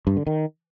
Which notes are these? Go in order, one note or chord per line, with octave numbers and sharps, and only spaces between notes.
G2
D3
D#3